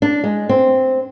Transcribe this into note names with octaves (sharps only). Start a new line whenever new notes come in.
D4
G#3
C4